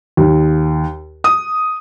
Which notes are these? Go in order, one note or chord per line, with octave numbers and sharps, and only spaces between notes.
D#2
D#6